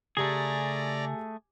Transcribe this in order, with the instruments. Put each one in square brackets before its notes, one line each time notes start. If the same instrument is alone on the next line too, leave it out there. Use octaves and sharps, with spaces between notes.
[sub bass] C#3 [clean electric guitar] A3 G#4 [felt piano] G4 G#5 [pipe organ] D5 A#5